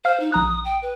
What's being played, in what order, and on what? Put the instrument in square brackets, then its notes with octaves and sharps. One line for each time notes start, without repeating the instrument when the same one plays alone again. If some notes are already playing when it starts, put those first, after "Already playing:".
[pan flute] C5 [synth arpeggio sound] F5 F6
[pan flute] D#4
[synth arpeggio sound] A#1 A#5 F#6 [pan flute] D#6
[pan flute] G5
B4